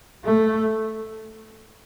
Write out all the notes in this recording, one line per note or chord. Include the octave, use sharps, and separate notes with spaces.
A3